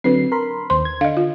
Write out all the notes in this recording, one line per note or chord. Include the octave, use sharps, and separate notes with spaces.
D3 F#3 C4 B4 C7
A#4 B5 C6
D#2 C5 C6
G#6
D3 D#5 F5
F4